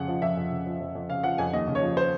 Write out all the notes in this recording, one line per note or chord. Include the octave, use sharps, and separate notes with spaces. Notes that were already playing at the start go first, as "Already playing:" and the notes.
Already playing: F2 C#3 F#5
F3
F2 E5
F2
C#3
F3
F2
F2
C#3 F5
F3 F#5
F2 G#5
D#2 D#5
C#3
C#5
F3
C5